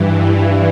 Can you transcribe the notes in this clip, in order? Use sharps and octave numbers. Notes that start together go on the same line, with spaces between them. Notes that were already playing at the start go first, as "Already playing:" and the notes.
Already playing: G2 E3